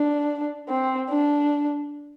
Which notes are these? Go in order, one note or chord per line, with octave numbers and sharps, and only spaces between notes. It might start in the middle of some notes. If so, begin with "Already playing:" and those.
Already playing: D4
C4
D4